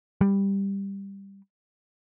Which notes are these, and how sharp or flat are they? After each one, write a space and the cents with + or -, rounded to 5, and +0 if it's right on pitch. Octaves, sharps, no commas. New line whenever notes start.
G3 +10